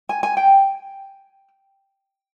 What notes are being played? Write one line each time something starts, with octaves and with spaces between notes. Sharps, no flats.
G#5
G#5
G5